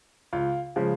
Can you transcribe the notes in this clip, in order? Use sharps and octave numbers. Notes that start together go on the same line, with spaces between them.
C#2 F4
C#3 F3 G#3